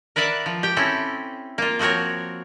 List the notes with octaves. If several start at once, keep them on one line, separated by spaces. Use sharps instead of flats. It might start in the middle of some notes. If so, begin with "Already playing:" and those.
A#4 B4 D5 E5 F#5
F3
G4 G5
C4 C#4 E4 A4
A#3 F4
F3 C4 F#4 A#4 C#5